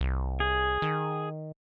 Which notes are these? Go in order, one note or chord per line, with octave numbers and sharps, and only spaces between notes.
C2
G#4
D#3